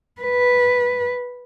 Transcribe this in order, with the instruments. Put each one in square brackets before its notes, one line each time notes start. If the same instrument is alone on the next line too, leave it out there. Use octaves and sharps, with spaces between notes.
[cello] B4